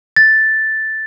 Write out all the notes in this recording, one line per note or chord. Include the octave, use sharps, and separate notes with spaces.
A6